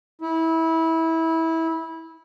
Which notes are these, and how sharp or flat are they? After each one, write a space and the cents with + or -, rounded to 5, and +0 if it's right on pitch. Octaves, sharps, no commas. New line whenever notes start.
E4 -20